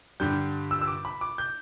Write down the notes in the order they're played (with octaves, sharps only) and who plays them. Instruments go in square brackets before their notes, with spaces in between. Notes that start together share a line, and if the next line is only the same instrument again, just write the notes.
[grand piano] G2 D3 G3 G6
E6
E6
D6
B5
D6
G6